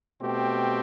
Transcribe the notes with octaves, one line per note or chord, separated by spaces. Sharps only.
B2 A3 C4 G4